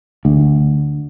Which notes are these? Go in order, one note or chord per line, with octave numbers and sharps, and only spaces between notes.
D2